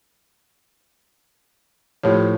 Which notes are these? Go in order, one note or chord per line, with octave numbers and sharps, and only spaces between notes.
A2 F3 F4 G4 C#5